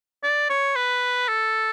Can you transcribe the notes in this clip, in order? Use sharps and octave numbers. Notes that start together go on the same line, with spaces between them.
D5
C#5
B4
A4